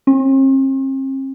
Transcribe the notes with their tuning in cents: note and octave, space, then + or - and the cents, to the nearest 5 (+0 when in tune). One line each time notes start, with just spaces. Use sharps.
C4 +45